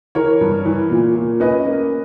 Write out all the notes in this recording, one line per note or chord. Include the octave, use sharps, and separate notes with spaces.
E3 A#4 C#5
G2
E3
A#2
A#2
C#4 B4 D#5
A#3